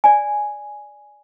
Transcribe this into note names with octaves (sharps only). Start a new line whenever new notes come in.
D5 G#5